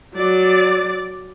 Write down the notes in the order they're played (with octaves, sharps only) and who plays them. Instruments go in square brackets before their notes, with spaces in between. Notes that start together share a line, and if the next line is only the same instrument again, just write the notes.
[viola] F#3 D5